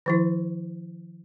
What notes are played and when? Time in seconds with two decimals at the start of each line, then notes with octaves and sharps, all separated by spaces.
0.06 D#3 F3 E4